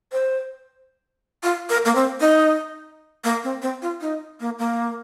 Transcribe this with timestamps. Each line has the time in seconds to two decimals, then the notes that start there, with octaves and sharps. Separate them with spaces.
0.13 C5
1.43 F4
1.70 A#4
1.85 A#3
1.95 C4
2.20 D#4
3.24 A#3
3.44 C4
3.62 C4
3.82 F4
4.01 D#4
4.40 A#3
4.59 A#3